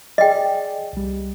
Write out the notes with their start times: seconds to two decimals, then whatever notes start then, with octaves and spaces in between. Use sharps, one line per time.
0.18 G#4 D5 D#5 G5
0.93 C2 G3